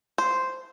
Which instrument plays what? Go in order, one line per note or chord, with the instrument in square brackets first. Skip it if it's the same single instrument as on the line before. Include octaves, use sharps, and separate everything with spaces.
[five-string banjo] C5